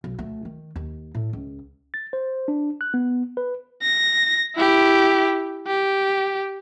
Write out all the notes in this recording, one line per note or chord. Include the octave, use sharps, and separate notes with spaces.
B1
D2 A3
D#3
D#2
A2
C#2
A6
C5
D4
F#6
B3
B4
A#6
E4 G4
G4